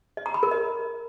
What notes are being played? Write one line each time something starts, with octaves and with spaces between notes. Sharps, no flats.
D#5
A#5
B5
A#4
D#5